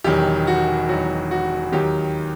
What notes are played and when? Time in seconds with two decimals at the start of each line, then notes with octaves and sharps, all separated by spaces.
0.04 E1 E2 D#3 F#3 G4
0.47 F#4
0.89 E1 E2 D#3 F#3 F#4
1.31 F#4
1.72 D#2 D#3 F#3 G4